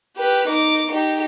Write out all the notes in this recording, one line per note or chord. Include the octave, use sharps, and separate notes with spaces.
G4 B4
D#4 D6
D#4 G4